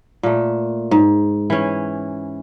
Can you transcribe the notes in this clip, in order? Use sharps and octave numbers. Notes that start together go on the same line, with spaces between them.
A#2 A3
G#2
E3 C#4